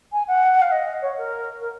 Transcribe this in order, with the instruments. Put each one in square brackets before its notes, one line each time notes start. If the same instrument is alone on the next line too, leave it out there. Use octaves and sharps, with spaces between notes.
[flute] G#5
F#5
F5
D#5
C#5
A#4
A#4